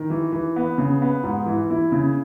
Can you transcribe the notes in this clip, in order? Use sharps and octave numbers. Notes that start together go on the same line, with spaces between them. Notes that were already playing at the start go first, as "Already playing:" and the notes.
Already playing: D#3
E3
E3
B3
C#3
B3
G#2
E3
E4
C#3